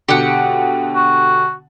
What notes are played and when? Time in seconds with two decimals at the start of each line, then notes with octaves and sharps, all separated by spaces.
0.09 B2 D3 G4 F#5
0.95 F#4